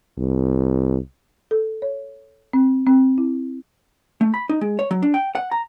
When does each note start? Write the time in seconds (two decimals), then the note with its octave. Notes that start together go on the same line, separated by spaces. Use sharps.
0.18 C2
1.51 A4
1.82 C#5
2.53 C4
2.87 C4
3.18 E4
4.21 A3
4.34 B5
4.49 D#4
4.61 G#3
4.79 C#5
4.91 F#3
5.02 D4
5.14 G5
5.35 F#5
5.51 A#5